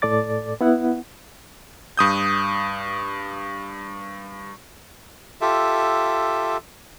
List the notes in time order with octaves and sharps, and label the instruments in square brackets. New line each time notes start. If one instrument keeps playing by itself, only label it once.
[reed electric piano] A2 A4 D5 D6 A6
B3 E4 F#5
[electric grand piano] G2 D#6 G6
[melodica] F4 G4 A4 E5